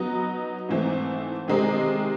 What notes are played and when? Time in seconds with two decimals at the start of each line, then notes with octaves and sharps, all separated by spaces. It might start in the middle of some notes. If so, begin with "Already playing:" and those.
Already playing: F#3 B3 D#4
0.69 G#2 E3 A3 C4
1.48 C3 D#3 G#3 C4 D#4